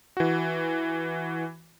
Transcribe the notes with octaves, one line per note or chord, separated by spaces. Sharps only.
E3 F#4